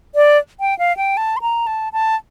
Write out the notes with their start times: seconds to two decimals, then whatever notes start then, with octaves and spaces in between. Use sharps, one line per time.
0.15 D5
0.60 G5
0.79 F5
0.97 G5
1.17 A5
1.37 C6
1.41 A#5
1.67 A5
1.93 A5